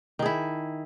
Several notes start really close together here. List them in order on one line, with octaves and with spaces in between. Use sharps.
D#3 G#4 E4